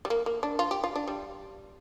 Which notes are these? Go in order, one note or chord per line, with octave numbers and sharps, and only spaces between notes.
G3
A#3
A#3
D4
F4
G4
F4
D4
G3